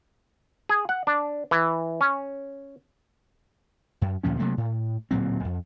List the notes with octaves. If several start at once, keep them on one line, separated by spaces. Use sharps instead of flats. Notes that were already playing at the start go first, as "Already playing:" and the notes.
G#4
F#5
D4
E3
C#4
F#2
D2 A#2 F3 C#4
C3 F#3 A3 A#3
A2
D1 A#2 F#3 C4
F2